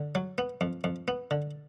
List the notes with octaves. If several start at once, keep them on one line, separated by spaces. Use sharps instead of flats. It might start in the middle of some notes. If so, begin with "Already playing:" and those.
Already playing: D3
F#3
B3
F2
F2
B3
D3